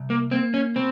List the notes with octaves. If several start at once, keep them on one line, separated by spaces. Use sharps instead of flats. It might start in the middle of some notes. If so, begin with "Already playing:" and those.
Already playing: C2
A#3
A#3 C4
C#4
B2 C4